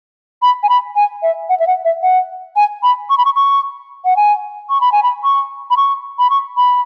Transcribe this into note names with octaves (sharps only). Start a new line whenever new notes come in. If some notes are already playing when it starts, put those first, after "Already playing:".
B5
G#5
B5
G#5
E5
F#5
E5
F#5
E5
F#5
G#5
B5
C#6
B5
C#6
C#6
F#5
G#5
C#6
B5
G#5
B5
C#6
B5
C#6
B5
C#6
B5